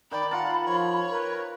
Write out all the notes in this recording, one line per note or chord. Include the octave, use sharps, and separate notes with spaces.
D#3 D5 G5 B5
F4 A#4 F#5 A5
F3 C#5
A#4 B4